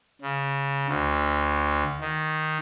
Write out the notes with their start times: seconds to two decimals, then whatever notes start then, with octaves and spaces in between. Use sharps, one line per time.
0.22 C#3
0.87 D2
2.01 D#3